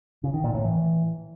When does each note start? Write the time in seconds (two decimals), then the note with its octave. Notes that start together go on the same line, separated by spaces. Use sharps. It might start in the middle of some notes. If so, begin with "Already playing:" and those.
0.24 C#3
0.34 D#3
0.44 A#2
0.54 A2
0.64 E3